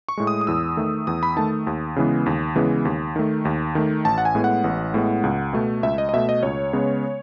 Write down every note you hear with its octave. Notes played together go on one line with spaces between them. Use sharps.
C#6
A2 G#3
D#6
D#6
E2 E6
D#3 A3
E2 D#6
B5
D#3 A3 A5
D#2
C#3 E3 G#3 B3
D#2
C#3 E3 G#3 B3
D#2
D#3 A3
D#2
D#3 A3
A1 A5
F#5
G#5
A2 G#3 B3
F#5
A1
A2 G#3 B3
C#2
B2 A3
C#2 E5
D#5
D#5
B2 A3 E5
D#5
C#2 C#5
C#3 G#3 B3